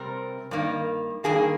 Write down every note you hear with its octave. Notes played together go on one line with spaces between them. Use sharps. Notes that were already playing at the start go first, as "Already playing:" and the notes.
Already playing: C3 G3 C4 A#4
G2 D#3 A#3
G2 D#3 A#3 G#4